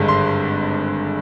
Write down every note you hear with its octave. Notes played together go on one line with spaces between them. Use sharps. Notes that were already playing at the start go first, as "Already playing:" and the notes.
Already playing: G#1 G2 D3 G#3
C6